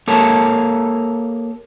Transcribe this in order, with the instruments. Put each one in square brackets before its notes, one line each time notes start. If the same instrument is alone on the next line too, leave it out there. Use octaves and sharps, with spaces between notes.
[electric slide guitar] A#3 G4 A4 A#4 C#5 A5